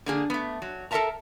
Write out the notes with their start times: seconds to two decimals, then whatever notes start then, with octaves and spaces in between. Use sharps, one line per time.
0.06 D3 A#3 G#4
0.30 A3 B3
0.62 F#3
0.91 A4 A#4 D#5 E5 A5 A#5